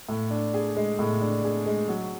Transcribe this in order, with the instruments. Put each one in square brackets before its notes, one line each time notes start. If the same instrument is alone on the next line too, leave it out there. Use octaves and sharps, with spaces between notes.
[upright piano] A2
D4
G#4
G#3
A2
D4
G#4
G#3
F#3